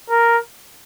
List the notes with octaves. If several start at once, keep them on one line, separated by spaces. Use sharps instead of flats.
A#4